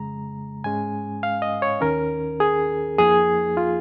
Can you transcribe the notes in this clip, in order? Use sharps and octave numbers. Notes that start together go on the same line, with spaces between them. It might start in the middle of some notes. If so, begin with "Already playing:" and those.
Already playing: F2 C#3 G#3 A#5
G#2 G#3 C#4 G#5
F5
D#5
C#5
D#2 D#3 C#4 A#4
G#4
F2 F3 A#3 D#4 G#4
F4